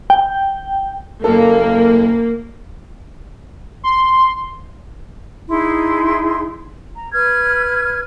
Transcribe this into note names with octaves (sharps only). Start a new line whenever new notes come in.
G5
F#1 A#3 A4
C6
D#4 E4 G#4 C6
A#5
B4 F6 G#6